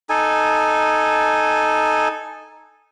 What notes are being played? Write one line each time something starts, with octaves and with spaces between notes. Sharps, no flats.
D#4 A4 G#5